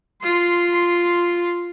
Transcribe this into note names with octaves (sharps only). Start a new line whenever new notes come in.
F4 C6